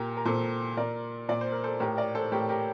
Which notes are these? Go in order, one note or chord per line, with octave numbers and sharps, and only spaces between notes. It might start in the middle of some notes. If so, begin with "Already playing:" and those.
Already playing: A#2 G4 A#4
A#4
A#2 A4 C5
A#2 A#4 D5
A#2 D5
C5
A#4
A4 C5
A2 G4 A#4
A#4 D5
A4 C5
A2 G4 A#4
G4 A#4